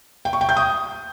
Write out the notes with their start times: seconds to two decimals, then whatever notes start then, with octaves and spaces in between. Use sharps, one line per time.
0.25 G5
0.33 C#6
0.41 G5
0.49 G6
0.57 D#6